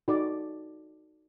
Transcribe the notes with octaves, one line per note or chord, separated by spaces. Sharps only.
D#4 F#4 A4 D5